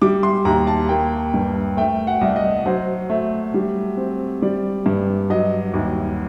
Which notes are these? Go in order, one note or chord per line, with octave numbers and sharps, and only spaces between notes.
G3 D6
C6
D#2 A#5
A5
A#3 G5
G2
A3 G5
F#5
C2
D#5
F#3 C5
A3
G3
C4
G3 D5
G2
F#3 D#5
D#2